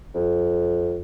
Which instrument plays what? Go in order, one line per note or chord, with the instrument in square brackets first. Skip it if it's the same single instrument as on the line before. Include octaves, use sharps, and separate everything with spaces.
[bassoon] F2